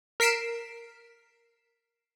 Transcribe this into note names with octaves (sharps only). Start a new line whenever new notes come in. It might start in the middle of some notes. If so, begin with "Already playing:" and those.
A#4 B6 C7 D7 E7